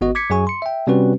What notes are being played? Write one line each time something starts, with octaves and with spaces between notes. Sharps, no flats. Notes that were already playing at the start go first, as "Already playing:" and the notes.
G#1 B3 F#4 D#5
D6 G#6 B6 C#7
F#2 F#3 G#4 G#5 C#6
C6 C#7
E5 G5
C3 G3 C4 C#4 F#4 B4